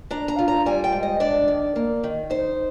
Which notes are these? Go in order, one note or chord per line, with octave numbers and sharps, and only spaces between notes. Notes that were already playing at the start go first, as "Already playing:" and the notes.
D4 A#5
A#5
F4
A#5
G3 G#5
G5
G#2
D#5
D4 D5
D#3
A#3
D#3
D#4 C5